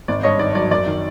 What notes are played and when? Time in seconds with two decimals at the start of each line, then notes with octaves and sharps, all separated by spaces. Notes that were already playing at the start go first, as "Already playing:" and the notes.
0.08 G#1 D5
0.23 G2 C#5 D#5
0.39 D#3 D5
0.55 F#3 D5
0.71 F#2 D5
0.87 D#3